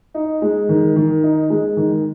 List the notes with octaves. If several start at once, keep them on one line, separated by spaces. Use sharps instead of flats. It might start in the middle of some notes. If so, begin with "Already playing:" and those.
D#4
G#3
D#3
D#3
D#4
G#3
D#3